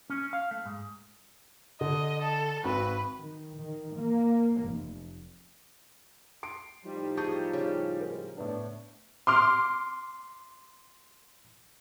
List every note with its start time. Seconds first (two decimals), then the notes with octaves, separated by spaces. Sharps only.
0.10 C#4
0.33 F5
0.51 A3
0.66 G#2
1.81 D3 D#5
2.21 A4
2.64 G#1 C4 F#4 B4
3.19 D#3
3.59 D#3
3.97 A#3
4.63 F1
6.43 C6 D7
6.85 A2 F3 G3 D#4 F4
7.17 G#4 A5 C#6 G6
7.53 C#3
8.01 G#2 A#4
8.37 A2 B3 D4
9.27 C6 D6 F6